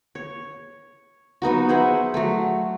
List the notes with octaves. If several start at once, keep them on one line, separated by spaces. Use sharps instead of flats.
C#5
F#3 B3 D#4 F#4
G#4 C5 E5 F#5
F#3 A3